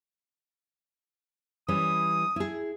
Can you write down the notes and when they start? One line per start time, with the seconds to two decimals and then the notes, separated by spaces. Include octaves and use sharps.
1.68 E3 G3 C#4 D#6
2.36 E4 G#4